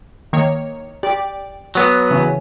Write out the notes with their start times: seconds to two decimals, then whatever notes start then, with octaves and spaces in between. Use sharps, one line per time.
0.33 D#3 A#3 C#5
1.03 G4 D5
1.75 F#3 B3
2.11 C#3 E3 C#4